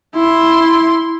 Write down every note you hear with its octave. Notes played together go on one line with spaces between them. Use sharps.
E4 C6